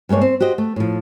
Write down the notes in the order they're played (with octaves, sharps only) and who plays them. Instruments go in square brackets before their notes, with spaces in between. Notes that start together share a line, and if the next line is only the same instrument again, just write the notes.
[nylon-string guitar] G2 G#3 A#3 C#5 D5
C4
F#4 G4 C5 D#5
A3
A2 F3